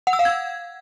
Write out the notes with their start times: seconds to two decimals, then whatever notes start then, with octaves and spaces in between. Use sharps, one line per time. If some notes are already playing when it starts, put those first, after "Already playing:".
0.07 F#5
0.13 E6
0.19 F5
0.25 G#6